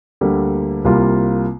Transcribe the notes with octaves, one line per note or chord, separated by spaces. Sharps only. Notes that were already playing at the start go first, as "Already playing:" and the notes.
D2 D3 G3 A#3
C2 C3 G3 A#3 F4